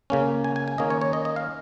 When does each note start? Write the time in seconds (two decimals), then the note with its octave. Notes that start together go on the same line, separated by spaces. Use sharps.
0.10 C#3 A#3 C#4
0.44 G#5
0.56 G#5
0.68 G#5
0.78 D#3 A#3 C#4 D#5
0.90 C#5
1.01 C#5
1.13 D#5
1.25 D#5
1.36 F5